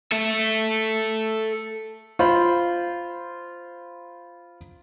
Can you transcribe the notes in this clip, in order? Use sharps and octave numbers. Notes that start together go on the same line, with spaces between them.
A4 E5
F4 C5 B5